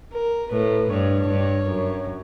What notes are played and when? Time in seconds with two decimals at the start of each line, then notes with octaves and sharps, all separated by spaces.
0.12 A#4
0.51 A2 B4
0.89 G2 C#5
1.28 G2
1.66 F#2